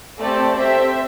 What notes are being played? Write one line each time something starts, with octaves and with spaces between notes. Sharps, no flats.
A3 C4 G4 A4 D5
C4 G4 C5 E5